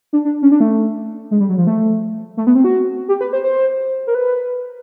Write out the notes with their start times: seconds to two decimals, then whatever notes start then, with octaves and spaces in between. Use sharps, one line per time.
0.13 D4
0.25 D4
0.42 C#4
0.52 D4
0.60 A3
1.31 G#3
1.40 G3
1.49 F#3
1.58 F3
1.67 A3
2.37 A3
2.47 B3
2.55 C4
2.64 F#4
3.08 G4
3.21 B4
3.33 C5
3.44 C5
4.07 A#4
4.15 B4